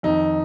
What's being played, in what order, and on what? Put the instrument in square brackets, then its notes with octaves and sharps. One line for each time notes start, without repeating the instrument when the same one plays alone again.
[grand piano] F2 D#3 D#4